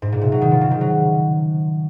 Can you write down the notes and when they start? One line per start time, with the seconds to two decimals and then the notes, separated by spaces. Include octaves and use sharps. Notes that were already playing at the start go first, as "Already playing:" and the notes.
0.02 G#2
0.12 A#2
0.21 C3
0.32 F#3
0.42 D#3
0.51 F3
0.61 C#3
0.71 D#3
0.81 F#3